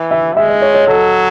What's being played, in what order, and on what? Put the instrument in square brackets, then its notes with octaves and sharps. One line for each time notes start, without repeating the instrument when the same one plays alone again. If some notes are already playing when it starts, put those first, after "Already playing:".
Already playing: [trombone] E3
[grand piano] E5
[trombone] G#3 [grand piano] E5
[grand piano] D#5
C#5
C#5
[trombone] F#3 [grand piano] A4